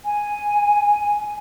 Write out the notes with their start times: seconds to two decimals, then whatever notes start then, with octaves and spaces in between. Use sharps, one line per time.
0.05 G#5